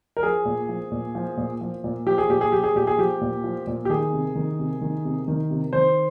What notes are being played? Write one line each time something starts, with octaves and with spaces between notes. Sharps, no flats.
A#4
F3 G#4
A#2
F3
A#2
F3
A#2
F3
A#2
F3 G4
G#4
A#2 G4
G#4
F3 G4
G#4
A#2 G4
G#4
F3 G4
A#2
F3
A#2
G4
D#3 G#4
C3
D#3
C3
D#3
C3
D#3
C3
D#3 C5